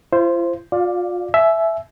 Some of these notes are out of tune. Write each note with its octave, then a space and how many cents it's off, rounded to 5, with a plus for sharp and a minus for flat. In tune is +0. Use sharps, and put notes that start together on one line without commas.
F4 -45 C5 +0
F4 +30 D5 +0 F5 +0
E5 +5 G#5 +40